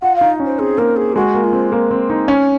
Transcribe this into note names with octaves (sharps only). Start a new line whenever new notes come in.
F4 F#5
F5
D#4
C#4
C5
C4 G#4
A#3 A#4
G#4
G#3 F#4
A#3
F4
C4
A#3
C4
D#4
C#4